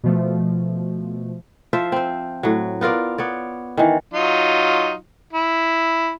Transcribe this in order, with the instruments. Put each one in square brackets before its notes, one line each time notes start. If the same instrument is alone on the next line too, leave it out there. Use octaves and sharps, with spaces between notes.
[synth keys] B2 F3 A3
[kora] F3 F4 C5 E5
C4 C5
A2 F#3
B3 F4 A#4 D5
B3 C#5 D5
D#3 E3
[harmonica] F#3 D#4 F4
E4